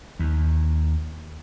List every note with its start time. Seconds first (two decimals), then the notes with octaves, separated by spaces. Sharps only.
0.19 D#2